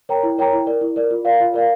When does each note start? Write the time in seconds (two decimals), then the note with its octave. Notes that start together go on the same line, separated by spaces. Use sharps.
0.09 A#4 C#5 G5 A#5
0.23 E4
0.38 A#4 C#5 G5 A#5
0.53 E4
0.67 A#4 D5
0.81 E4
0.96 A#4 D5
1.11 F4
1.25 A#4 D5 F5
1.40 F4
1.54 A#4 D5 F5